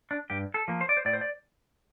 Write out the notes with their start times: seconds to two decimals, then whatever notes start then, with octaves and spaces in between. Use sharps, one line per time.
0.11 D4
0.30 G2 G4
0.54 A4
0.68 F3 A#3
0.81 C5
0.89 D5
0.97 C5
1.05 A2 D5
1.13 C5
1.21 D5